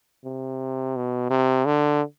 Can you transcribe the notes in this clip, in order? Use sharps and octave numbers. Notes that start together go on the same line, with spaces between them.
C3
B2
C3
D3